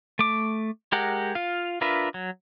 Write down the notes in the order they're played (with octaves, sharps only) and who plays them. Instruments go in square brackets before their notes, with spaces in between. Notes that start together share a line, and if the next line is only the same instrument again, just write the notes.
[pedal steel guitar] A3 D6
G#3 G4 A#4 F#5
F4 F5
D4 F4 A#4 B4 E5
F#3